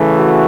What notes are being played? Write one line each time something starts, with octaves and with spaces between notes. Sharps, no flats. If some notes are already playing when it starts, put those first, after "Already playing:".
Already playing: C#3 E3 A3
F#4